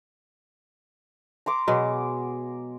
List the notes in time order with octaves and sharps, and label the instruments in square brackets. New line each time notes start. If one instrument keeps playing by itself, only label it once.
[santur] A#5 C6 D6
[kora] B2 F#3 [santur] G#3